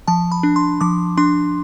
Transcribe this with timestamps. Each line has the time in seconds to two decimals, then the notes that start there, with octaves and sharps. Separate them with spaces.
0.08 F3 A5
0.32 B5
0.43 D4
0.56 C6
0.81 F3 D6
1.17 D4 C6